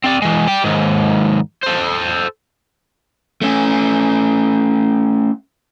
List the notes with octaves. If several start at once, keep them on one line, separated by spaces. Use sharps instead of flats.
C4 D5
E3 G#3
D5 G5
D#2 G#2
A4 C5
A3 C#4